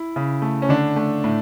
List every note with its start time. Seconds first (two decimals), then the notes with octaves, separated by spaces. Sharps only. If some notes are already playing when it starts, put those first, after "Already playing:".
Already playing: E4
0.16 C#3
0.42 A3
0.62 C#4
0.69 D3 D4
0.96 A3
1.24 A2